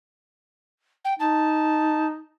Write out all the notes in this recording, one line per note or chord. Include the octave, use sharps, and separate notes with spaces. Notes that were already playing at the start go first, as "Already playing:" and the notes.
G5
D#4 A5